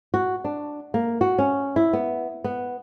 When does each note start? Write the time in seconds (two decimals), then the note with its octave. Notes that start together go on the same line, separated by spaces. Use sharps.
0.14 F#4
0.44 D4
0.94 A#3
1.21 F#4
1.38 C#4
1.76 E4
1.93 B3
2.44 B3